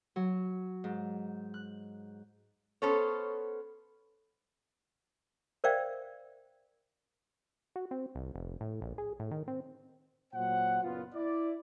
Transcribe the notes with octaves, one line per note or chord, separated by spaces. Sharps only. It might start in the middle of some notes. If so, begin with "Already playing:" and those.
F#3
G#2
F#6
B3 C#4 A4 C5 C#5
A#4 C5 D5 E5 F5 G5
F#4
C4
C2
F1
A2
A#1
G#4
A2
D#3
C4
A#2 F#3 C5 F#5
F#1 A#2 B3 F4
E4 D5